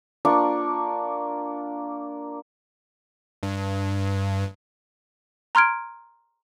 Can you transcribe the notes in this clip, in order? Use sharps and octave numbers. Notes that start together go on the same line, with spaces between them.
A#3 D4 F4 C#6
G2
A#5 C6 F6 G#6 D7